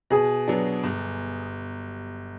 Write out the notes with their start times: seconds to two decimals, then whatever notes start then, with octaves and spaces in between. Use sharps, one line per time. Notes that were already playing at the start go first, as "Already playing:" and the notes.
0.10 B2 G#4
0.48 F#3 B3 D4
0.83 G1